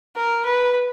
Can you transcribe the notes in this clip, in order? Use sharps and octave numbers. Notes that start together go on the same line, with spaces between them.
A#4
B4